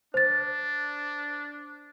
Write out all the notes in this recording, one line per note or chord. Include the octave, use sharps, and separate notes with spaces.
D4 C5 A6